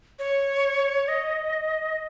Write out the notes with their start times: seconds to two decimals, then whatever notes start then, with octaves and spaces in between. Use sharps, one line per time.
0.19 C#5
1.08 D#5